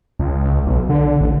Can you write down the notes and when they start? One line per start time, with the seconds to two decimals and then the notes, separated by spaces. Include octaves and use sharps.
0.19 C#2
0.67 B1
0.89 D3
1.21 A1